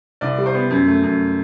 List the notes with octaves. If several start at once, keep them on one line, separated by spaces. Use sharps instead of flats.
C2 D5
G3
C5
B3
F#2
A3
F#2